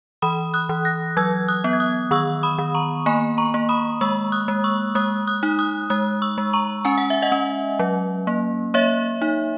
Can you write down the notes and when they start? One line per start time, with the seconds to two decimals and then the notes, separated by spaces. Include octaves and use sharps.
0.22 E3 B5 D#6
0.54 D#6 F#6
0.69 E3
0.85 F#6 A#6
1.17 F#3 E6 G#6
1.48 D#6 F#6
1.64 B3
1.73 G#6
1.80 D#6 F#6
2.11 D#3 C#6 E6
2.43 B5 D#6
2.58 D#3
2.75 A#5 C#6
3.06 A#3 G#5 B5
3.38 A#5 C#6
3.54 A#3
3.69 B5 D#6
4.01 G#3 C#6 E6
4.32 D#6 F#6
4.48 G#3
4.64 C#6 E6
4.95 G#3 D#6 F#6
5.27 D#6 F#6
5.43 D#4
5.59 D#6 F#6
5.90 G#3 D#6 F#6
6.22 C#6 E6
6.38 G#3
6.53 A#5 C#6
6.85 C#4 G#5
6.98 F#5
7.10 E5
7.22 D#5 F#5
7.32 C#4
7.79 F#3
8.27 A#3
8.74 A#3 C#5 E5
9.22 D#4